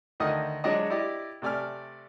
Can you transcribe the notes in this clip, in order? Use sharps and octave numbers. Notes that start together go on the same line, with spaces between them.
D2 D#3 A3 D#5 D#6
F#3 G#3 D4 F#4 C#5 D#5
E4 G4 D5 D#5
C3 A3 D5 G#5 F6